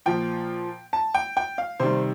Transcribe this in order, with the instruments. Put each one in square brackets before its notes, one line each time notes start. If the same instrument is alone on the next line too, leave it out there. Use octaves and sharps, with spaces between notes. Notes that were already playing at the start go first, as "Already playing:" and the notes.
[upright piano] A#2 F3 G5
A5
G5
G5
F5
C3 D#3 G3 C5